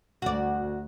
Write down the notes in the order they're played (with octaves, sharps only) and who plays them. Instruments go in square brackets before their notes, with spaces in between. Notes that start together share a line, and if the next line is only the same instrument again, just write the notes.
[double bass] D2 [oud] F#4 D5